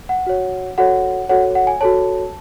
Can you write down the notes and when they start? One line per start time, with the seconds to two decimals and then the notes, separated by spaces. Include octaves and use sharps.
0.09 F#5
0.27 F#4 C#5
0.78 F#4 A4 C#5 F#5
1.29 F#4 A4 C#5 F#5
1.55 F#5
1.67 G#5
1.81 F#4 A4 C#5 A5